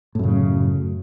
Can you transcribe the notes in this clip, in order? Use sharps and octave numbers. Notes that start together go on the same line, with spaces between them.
F#2 A2 C#3